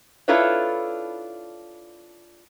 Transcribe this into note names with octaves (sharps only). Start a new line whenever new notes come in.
D4 E4 F4 A4 B4 C#5